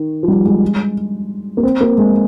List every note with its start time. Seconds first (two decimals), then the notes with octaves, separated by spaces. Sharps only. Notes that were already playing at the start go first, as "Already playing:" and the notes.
Already playing: D#3
0.23 F3
0.28 G3
0.45 G#3
1.57 A#3
1.63 C4
1.81 A#3
1.98 G#3